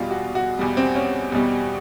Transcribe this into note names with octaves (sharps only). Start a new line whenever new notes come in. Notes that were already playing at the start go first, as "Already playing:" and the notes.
Already playing: E2 B2 G3 F4
F#4
F#4
E2 B2 G3
C4
C#4
E2 B2 G3